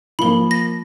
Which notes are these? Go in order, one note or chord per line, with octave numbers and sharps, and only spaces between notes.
F3 A#3 B5 G7
A#6